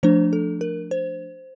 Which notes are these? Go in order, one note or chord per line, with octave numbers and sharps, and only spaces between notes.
F3 A3 D4 C5
A4
A#4
C5